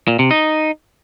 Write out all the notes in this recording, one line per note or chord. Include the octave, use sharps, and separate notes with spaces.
A#2
C3
D#4